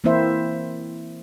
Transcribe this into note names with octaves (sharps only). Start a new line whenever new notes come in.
E3 A#3 C4 E4 C5 E5